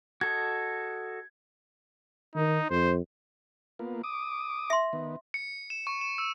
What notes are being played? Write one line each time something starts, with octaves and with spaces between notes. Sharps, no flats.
F#4 A4 D#5 G#6
D#3 D#4
F2 C5
A#3 B3 F4
D6 D#6
E5 C6
D#3 B3
C#7
E7
C#6
E7
E6